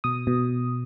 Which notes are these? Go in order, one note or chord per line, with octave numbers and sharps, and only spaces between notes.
B2 D#6
B2